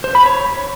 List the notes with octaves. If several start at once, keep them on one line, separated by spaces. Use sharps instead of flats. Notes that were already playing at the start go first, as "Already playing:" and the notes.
C5
B5
C#5